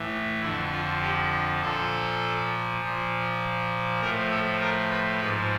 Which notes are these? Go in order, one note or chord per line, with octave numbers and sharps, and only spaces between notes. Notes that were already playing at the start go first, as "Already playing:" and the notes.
Already playing: A2 E3
F2 D3 F3 E4
F4
G4
A#2 F3 A4
A#2 F3
A2 F3 A#4
A4
A#4
B4
G#2 F3 B4